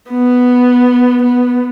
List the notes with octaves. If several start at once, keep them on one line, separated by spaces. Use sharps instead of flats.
B3
B3